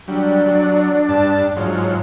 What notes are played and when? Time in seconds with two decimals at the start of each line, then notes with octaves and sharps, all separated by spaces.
0.08 F#3 G3 D4
0.46 F#3
1.09 G2 A5
1.56 G#2 F3 F#3 C#5